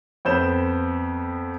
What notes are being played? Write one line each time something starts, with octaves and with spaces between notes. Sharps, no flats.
F2 B3 C4 G6 E7